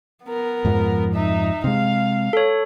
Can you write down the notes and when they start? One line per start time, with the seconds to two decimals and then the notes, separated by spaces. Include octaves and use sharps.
0.24 B3 A#4
0.65 F2 G#2 F3
1.13 D#4 E5
1.64 C3 G#3 F5
2.33 A4 C#5